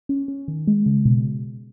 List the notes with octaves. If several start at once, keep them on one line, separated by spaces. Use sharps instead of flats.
C#4
C#4
D#3
G#3
C#3
B2